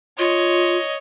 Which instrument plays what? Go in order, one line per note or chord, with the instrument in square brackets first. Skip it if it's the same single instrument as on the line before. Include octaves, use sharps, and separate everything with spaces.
[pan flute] F4 [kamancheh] C#5 D#5